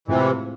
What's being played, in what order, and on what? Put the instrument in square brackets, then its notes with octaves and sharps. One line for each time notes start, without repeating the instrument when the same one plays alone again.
[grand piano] A2 G#3 C4 F4 [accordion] C3 E3